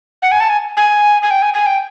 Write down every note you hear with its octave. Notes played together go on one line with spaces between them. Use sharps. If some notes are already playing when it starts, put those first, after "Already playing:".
F#5
G#5
A5
G#5
G#5
G#5
G5
G#5
G#5
G5